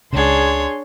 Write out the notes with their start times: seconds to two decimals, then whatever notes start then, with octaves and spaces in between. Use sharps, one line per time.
0.13 C#2 C#3 D4 G#4 C#5 C6